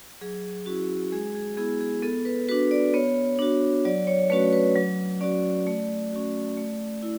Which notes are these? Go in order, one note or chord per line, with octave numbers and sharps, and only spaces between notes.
F#3 G#4
C#4 E4 F#4
G#3 G#4
G#4
B3 E4 G#4
G#4
B3 A4
B4
D4 F#4 B4
D5
B3 C#5
D4 F#4
F#3 D5
C#5
A3 C#4 F#4 B4
B4
F#3
C#4 F#4 D5
A3
C#4 F#4
A3
E4